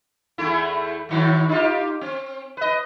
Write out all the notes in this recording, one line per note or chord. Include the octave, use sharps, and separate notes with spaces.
E2 A3 E4
A2 D#3 F#3
D#4 F4 G4
C4
B4 D#5